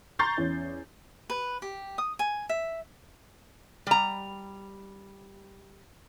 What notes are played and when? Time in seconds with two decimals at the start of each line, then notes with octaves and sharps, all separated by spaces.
0.19 A#5 C6 C#6 G6 A6 C7
0.37 E2 C#4
1.30 B4
1.62 G4
1.98 D#6
2.19 G#5
2.49 E5
3.87 G3 A#5